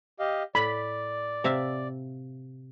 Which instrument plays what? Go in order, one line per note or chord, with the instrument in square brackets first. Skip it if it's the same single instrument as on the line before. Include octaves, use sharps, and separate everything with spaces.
[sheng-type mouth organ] G4 D#5 F5
[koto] A2 [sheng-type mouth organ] D5 [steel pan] B5
[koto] C3 E5 F5